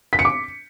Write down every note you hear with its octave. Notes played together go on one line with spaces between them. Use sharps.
B6
C#7
D6